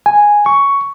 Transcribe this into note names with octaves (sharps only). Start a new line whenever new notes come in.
G#5
C#6